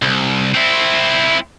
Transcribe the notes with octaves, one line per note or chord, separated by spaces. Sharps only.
C2
C4 E4